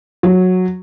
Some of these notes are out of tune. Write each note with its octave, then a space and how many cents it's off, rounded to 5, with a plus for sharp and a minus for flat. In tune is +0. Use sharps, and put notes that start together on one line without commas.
F#3 -10